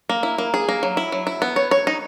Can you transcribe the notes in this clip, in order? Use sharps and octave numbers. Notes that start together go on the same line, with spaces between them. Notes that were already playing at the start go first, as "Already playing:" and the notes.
A#3
E4
A#3
G#4
A#3
F#3
E4
F#3
E4
B3
C#5
C#5
D#4